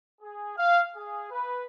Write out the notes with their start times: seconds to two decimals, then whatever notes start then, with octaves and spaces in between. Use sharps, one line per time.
0.21 G#4
0.56 F5
0.94 G#4
1.30 B4